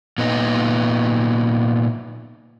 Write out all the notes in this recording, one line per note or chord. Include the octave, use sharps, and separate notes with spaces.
A#2 B3 D#4